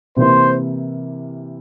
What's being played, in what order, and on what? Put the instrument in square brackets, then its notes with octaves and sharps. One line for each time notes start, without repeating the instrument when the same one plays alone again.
[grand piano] C3 E3 A#3 E4 [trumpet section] C5